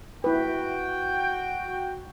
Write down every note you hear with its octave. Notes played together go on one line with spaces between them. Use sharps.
E4 F#4 B4 G5